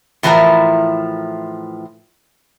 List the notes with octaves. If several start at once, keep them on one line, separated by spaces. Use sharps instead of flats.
A2 E3 F3 E4 A#4 A#5